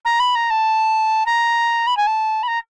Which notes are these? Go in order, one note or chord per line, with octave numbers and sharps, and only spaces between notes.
A#5
B5
A#5
A5
A#5
B5
G#5
A5
B5
A#5